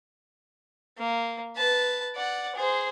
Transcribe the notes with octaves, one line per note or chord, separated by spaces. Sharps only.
A#3
B4 A5
D5 F#5
G#4 C5